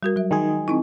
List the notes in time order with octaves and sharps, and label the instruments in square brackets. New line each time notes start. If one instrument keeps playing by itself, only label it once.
[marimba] G3 F#4 A#4
F#3 E5
[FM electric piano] D#3 G#3 G#4
[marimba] C4 D#4 E4